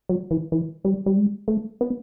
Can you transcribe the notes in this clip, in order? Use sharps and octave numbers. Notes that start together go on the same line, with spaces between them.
F#3
E3
E3
G3
G3
G#3
A3
B3